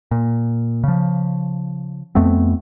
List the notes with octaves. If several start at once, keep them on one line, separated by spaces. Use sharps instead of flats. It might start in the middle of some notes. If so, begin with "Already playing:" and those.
A#2
C#3 F3
F2 A3 B3 C4